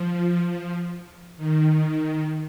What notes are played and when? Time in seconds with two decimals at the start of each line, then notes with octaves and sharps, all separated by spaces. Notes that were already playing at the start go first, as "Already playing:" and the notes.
Already playing: F3
0.45 F3
1.37 D#3